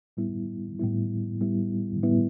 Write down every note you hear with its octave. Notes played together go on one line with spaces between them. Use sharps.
A2 G3 B3 E4
A2 G3 B3 E4
A2 G3 B3 E4
A2 G3 B3 E4